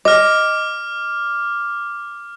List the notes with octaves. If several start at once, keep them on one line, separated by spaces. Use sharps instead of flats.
D#5 D6 F6